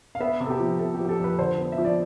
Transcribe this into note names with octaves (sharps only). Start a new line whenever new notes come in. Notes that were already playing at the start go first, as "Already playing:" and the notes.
F5
B3 E5
C3
A4
G4
F3
C3 A4
G4
F3
G4
A4
F2
B4
D3 C5
B3
E5
F3
D5